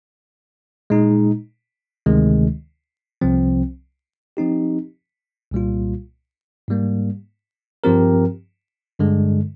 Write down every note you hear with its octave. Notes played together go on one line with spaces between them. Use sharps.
A#2 G#3 D#4
D2 C3 D#3 G#3
C2 C3 F3 C4
F3 C4 D#4 G4
C2 A#2 G3 A#3 F4
G#2 G3 A#3
G2 F3 C4 G4 A#4
G2 D3 G#3